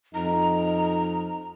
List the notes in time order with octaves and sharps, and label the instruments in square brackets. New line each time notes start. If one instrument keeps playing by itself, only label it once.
[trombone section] F2 D#4 [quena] A#5